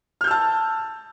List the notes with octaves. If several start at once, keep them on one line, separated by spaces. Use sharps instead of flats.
A5 E6 F6 G6